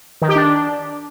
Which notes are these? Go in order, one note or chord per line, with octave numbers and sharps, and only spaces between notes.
D#3
G4
D4